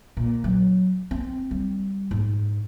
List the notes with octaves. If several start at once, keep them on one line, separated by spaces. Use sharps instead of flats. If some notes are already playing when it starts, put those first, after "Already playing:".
A#2
F#3
C4
G3
G#2